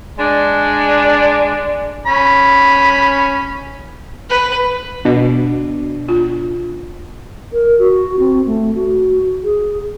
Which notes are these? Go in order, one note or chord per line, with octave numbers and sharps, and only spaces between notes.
G#3 D4
C#4 B5
B4
B2 D4
F4
A#4
F#4
C4
A3
F#4
G#4